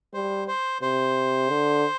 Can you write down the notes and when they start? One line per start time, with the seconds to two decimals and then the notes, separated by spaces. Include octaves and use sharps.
0.14 G3 C5
0.48 C5
0.82 C3 C5
1.50 D3